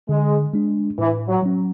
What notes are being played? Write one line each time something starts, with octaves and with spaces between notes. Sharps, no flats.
D3 G#3
G#3 D4
A2 E3
F#3
F#3 C#4